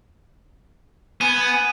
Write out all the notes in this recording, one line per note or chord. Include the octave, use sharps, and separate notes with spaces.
B3 G#5 D#7